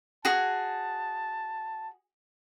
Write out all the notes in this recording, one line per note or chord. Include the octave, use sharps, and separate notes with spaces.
F#4 G#4 A5